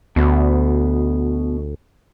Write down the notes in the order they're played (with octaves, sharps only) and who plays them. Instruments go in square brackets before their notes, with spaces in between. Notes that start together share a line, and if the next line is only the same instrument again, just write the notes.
[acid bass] D2 [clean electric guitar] B2